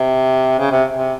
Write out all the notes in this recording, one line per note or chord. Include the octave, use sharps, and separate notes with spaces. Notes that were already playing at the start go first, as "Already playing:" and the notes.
Already playing: C3
C#3
C3
C3